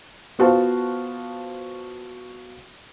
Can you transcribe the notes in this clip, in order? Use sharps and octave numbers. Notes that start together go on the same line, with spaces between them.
B3 F4 F#4 C5 F5 A5